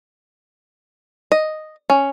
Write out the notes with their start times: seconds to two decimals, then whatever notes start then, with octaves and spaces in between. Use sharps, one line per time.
1.32 D#5
1.90 C#4